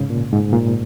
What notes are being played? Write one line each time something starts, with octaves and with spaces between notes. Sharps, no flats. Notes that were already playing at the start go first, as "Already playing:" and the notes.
Already playing: G#2 C#3
A#2
G#2
A#2